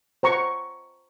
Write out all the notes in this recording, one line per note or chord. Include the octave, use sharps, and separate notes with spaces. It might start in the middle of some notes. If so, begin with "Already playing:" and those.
C5 A#5 C#6